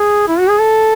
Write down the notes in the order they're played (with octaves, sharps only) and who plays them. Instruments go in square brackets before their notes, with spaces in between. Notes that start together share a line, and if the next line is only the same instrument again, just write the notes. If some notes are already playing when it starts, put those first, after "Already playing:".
Already playing: [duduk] G#4
E4
F#4
G#4
A4